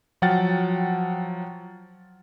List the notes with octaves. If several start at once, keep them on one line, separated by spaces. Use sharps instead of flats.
F3 F#3 F#5 G5 F6 A6